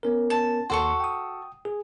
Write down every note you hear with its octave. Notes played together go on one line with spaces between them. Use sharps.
B3 C#4 A#4
A5
D#2 F#4 A4 C6 C#6
G5 D#6
G#4